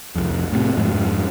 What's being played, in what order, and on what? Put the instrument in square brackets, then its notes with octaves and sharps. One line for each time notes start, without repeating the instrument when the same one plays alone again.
[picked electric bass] C2 F2
A2 C3
F2 G#2